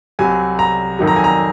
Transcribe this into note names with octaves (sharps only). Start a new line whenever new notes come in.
C2 C3 F#3 G#5
A#5
F2 D#3 F#3
A#5
G#5
A#5